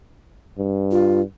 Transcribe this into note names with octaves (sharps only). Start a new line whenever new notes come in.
G2
F4